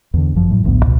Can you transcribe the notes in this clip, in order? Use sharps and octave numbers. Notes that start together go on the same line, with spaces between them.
E2 D3
G1 F#2 F3
A2 F#3
A1 D2 G#2 B3
C#2 B2